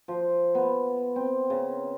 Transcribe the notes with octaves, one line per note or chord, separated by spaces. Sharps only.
F3
B3
C4
C#3